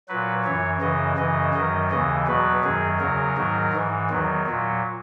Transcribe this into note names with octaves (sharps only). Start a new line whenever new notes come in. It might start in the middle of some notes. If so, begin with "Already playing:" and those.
A#2 F#3 B4
F#2 E3 C#5
F#2 C#3 E3 D#5
F#2 C#3 E3 D#5
F#2 D#3 F#3 D#5
D#2 C#3 E3 D#5
E2 B2 F#3 B4
F#2 D#3 F#3 G#4
E2 C#3 F#3 A#4
G#2 D#3 F#3
G#2 E3
E2 D#3 F#3
A#2 F#3